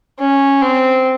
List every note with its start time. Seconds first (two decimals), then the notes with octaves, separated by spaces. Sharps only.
0.19 C#4
0.62 C4